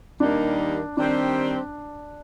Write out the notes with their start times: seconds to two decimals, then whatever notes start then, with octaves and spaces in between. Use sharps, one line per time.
0.20 D#2 D#3 G3 A#3 D4 D#4
0.97 D#3 G3 C4 D4 G4